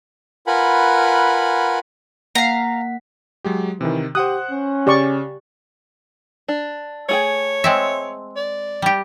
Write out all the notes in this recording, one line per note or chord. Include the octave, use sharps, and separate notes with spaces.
F4 A#4 B4 F#5 G#5 B5
A#3 F5 F#5 A#5 B6
F#3 G#3 G4
C3 D#3 E3
G4 C5 F#5 D#6 F#6
C#4
C#3 G4 D5 C#6
D4
A3 G#4 C#5 G5
G#3 C4 E5
D5
G3 G4